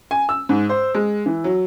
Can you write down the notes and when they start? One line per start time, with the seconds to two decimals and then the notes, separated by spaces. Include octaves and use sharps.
0.11 G#5
0.29 E6
0.49 G#2
0.69 C5
0.94 G#3
1.26 E3
1.44 F#3